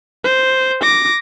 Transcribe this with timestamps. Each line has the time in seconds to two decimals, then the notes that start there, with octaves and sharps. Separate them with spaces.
0.24 C5
0.82 D6 A#6